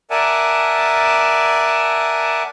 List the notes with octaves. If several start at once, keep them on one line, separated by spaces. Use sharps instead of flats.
A#4 D5 E5 F#5 G#5 A5